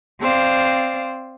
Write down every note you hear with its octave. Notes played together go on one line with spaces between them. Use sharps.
C4 C5 D5 F5